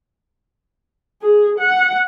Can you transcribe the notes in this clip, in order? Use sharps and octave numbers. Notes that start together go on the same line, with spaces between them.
G#4
F#5